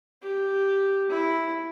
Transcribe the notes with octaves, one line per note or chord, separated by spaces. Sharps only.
G4
E4